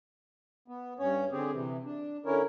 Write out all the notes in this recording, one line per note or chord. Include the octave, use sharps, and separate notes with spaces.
B3
G2 C#4 C#5
D3 C4 G4 G#4
C3 E3
D4
D3 C#4 E4 A#4 C#5